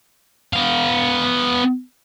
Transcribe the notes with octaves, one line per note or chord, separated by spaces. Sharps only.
B3 F5